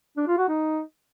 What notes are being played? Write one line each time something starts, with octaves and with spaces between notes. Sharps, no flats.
D4
F4
F#4
D#4